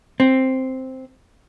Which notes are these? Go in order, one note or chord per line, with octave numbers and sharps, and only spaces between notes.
C4